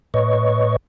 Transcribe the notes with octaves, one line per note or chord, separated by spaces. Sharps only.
A2 B4 C#5 D#5 C#6